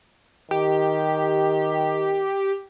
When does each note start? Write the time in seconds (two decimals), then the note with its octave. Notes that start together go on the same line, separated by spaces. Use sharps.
0.51 D#3 G4